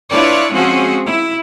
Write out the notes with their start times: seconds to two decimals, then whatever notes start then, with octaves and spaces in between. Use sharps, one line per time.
0.11 D4 E4 F4 B4 C#5 D5
0.53 F3 G#3 C4 C#4 F#4 G#4
1.06 E4